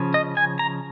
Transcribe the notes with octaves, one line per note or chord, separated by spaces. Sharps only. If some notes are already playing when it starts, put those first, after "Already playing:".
Already playing: C#3 F3 C#4
D#5
G#5
A#5